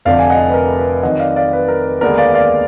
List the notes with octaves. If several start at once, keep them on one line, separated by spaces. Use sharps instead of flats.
F1 F2 D3 F3 D5 F5
G#5
D#5 F#5
B4
A#4
B4
F2 D#3 F#3 D#5 F#5
D5 F5
D5 F5
B4
A#4
B4
D#2 D3 G#3 B3 A#4 D5
D5 F5
D5 F5